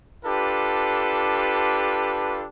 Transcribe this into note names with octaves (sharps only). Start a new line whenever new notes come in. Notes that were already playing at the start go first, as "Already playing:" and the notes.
D4 F4 G4 A4 B4